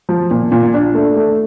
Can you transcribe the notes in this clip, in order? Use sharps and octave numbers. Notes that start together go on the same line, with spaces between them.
F3
A#2
A#2
D4
A3
A3